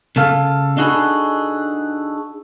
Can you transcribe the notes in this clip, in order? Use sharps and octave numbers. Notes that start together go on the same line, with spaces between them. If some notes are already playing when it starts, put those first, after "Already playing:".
C#3 A3 A4 F5
D4 D#4 F#4 G#4 A4 B4